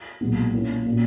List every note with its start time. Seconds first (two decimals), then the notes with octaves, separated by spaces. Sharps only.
0.21 B1 A#2 G#3 B3 D#4
0.53 A#2 A#3 C#4 E4
0.86 A#2 A#3 C#4 F#4